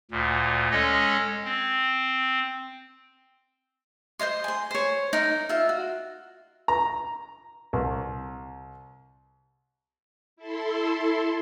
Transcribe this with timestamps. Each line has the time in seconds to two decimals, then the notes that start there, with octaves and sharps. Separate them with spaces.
0.11 D2 A#2
0.71 G#3 C#4 A4 C#5 D#5
1.44 C4
4.19 C5 C#5 D#5 C6
4.44 G#5 C6
4.71 C5 C#5
5.13 D#4 A#4
5.49 F4 E5
5.69 F#4
6.68 A#5
7.73 C2
10.36 E4 A4 C6